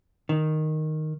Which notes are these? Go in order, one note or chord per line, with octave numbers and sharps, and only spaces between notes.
D#3